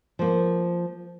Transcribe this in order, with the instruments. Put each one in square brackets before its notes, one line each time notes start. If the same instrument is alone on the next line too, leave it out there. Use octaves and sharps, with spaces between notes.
[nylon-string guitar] F3 A#3